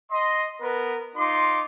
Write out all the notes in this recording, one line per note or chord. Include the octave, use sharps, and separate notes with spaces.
D#5 C6
B3 A#4 B4
D#4 F4 C6 D6